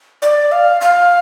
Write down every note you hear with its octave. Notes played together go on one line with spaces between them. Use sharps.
D5
F5
F5